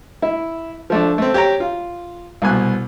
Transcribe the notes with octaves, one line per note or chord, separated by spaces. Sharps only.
E4
F3 A3 D4
A3 C4
G4 C#5 G5 A#5
F4
C2 B2 G#5 F#6